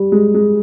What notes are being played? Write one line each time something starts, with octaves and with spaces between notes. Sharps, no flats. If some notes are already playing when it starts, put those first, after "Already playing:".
Already playing: G3
G#3
G#3